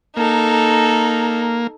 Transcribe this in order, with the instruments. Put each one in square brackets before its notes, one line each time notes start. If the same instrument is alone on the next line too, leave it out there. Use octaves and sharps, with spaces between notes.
[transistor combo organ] A#3 [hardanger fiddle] D#4 A4